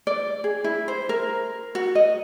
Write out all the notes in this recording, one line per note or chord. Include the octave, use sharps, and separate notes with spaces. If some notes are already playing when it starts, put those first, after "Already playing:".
D5
G#4
E4
C5
A#4
F#4
D#5